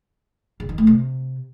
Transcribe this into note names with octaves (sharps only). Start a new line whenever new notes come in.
C#3
D#3
A3
C3